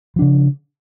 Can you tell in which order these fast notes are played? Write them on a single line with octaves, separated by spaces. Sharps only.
F3 D4 C#3